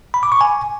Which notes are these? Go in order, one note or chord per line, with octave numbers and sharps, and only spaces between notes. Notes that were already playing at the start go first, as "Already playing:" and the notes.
B5
D6
C#6
G#5